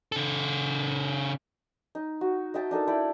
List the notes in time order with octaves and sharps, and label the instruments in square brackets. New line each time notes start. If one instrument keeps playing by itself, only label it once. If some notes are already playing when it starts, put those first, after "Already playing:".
[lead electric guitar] C#3 A4
[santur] D#4
F#4
D#5 E5 G5 A5
D4 D#4 A4 A#4
E4 A4 D5 G5